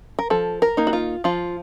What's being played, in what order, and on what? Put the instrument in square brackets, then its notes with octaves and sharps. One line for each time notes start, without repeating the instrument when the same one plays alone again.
[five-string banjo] A#4
F3 A4
A#4
A#3 D#4
F#4
F4
F3 F4